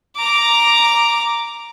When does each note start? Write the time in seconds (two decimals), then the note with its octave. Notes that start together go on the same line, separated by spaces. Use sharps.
0.17 A#5 D6